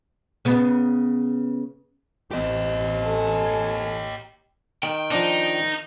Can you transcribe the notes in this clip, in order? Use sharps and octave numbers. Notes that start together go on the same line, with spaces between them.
C#3 B3
A1 C4 G4 D#5
A4 G#5
D#3 G5
F3 D4 D#4